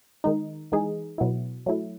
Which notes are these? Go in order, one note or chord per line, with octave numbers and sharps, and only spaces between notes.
D#3 G#3 D#4
E3 G#3 D#4 G#4
B2 F#3 B3 E4
F#3 A3 E4